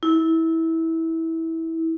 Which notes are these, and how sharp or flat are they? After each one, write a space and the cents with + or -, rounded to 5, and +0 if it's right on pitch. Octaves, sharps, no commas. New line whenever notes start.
E4 -20